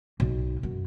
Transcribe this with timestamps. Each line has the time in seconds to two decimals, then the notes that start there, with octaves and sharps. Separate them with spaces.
0.20 B1
0.63 F#2